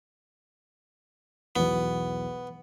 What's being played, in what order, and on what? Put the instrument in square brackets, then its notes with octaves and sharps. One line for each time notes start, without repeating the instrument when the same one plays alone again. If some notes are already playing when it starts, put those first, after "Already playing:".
[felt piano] B1 E2 [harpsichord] B3